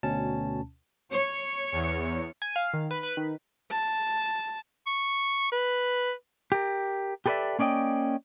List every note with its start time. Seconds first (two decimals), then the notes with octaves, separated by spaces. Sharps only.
0.03 D2 B2 C#4 A5
1.10 C#5
1.72 E2
2.42 G#5
2.56 F5
2.74 D#3
2.91 B4
3.03 B4
3.17 D#3
3.71 A5
4.86 C#6
5.52 B4
6.52 G4 A#4
7.26 G4 A4 B4 C5 D5 E5
7.59 A#3 C#4 D5 D#5 G5